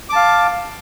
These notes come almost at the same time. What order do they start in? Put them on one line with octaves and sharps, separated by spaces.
D6 A5 F5